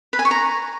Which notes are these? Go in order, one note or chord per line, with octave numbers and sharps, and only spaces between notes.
B4
G#5
C#6
A#5